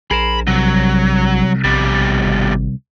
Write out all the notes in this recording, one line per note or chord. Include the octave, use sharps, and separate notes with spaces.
A#1 G#4 A#4 C5 B5
C2 F#3
A#1 B2 G3
G#1